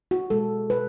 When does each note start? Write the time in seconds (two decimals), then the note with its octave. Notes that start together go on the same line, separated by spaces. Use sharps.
0.11 F#4
0.30 B2 G#3 A4
0.70 B2 G#3 B4